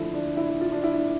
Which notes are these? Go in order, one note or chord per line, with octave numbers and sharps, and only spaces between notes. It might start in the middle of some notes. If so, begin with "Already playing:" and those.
Already playing: D3 F3 A3 E4
D4
E4
F4
D4
E4